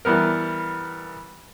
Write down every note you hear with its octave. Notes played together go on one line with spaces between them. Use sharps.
E3 G3 B3 A#4